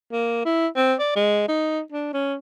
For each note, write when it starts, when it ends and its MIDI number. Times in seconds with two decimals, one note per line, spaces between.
0.11 0.42 58
0.45 0.67 64
0.76 0.94 60
0.99 1.12 74
1.15 1.46 56
1.48 1.81 63
1.92 2.10 62
2.13 2.35 61